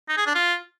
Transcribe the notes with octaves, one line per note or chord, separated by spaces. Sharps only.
D#4
G#4
D4
F4